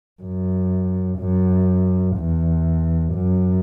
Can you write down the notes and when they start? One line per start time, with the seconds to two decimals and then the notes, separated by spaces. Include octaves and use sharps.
0.22 F#2
1.20 F#2
2.17 E2
3.15 F#2